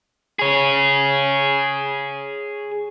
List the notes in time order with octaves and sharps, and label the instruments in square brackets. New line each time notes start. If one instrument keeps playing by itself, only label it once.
[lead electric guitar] G#4 C#5